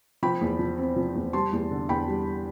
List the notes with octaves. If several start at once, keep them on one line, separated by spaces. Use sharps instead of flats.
F3 G5 B5
E2
F3
C4
F3
E2
G3 A5 C6
E2
D3
E2 G5 B5
G3